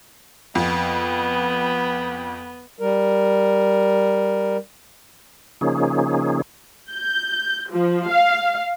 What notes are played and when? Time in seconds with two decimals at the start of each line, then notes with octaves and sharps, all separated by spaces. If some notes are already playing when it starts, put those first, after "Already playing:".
0.55 F2 B3
2.79 G3 A#4
5.61 C#3 F3 A#3 C#4 D#4 G#4
6.91 G6
7.71 F3
8.11 F5